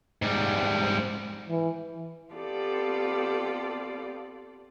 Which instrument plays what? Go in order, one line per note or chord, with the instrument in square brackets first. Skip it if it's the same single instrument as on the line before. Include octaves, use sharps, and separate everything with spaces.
[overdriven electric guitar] G#2 G3
[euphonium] E3
[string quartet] B3 C4 F4 G4 A4 D5